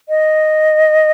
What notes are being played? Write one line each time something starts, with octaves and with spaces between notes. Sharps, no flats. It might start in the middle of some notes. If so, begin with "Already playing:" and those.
D#5